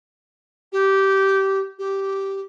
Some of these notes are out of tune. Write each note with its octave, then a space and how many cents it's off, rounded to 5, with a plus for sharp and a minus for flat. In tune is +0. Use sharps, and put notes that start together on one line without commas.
G4 -15
G4 -10